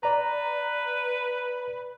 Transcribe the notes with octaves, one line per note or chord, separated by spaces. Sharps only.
B4 D5 A#5